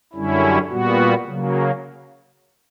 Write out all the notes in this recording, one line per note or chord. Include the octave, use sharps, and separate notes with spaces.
F#2 D3 G3 C#4 E4
A#2 G3 B3 F#4
C#3 F#3 A#3